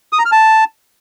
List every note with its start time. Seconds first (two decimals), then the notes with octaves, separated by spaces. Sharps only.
0.13 D#6
0.19 A#5
0.25 F6
0.32 A5